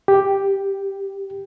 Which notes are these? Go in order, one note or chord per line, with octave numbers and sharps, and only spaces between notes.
G4